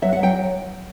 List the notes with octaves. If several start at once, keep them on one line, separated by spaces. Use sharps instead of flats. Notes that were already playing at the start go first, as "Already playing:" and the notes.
F#3 E5
F#5
F#3 G5